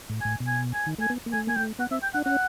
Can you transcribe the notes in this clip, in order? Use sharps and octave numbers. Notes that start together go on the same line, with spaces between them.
A2
A2 G#5
B2
G#5
G#5
D#3
A3 G#5
B3
A#3
A3 G#5
A#3 G#5
A3 G5
B3 F#5
C4 E5
G5
D4 F#5
C#4 F#5